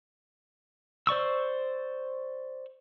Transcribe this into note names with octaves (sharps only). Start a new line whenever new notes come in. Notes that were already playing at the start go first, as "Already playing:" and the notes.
C5 D5 C#6 E6